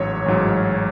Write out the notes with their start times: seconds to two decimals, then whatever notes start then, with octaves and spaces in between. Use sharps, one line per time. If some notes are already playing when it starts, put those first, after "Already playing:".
Already playing: A1 G#2 F#3 C#5
0.26 A1 G#2 F#3